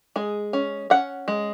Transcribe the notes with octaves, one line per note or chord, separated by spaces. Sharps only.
G#3 G#4
C#4
C#4 F#5
G#3